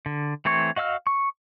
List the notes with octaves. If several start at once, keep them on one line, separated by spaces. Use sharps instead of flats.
D3
E3 A3 C4 C#5 C#6
F#4 D#5 F5 E6 F6
C#6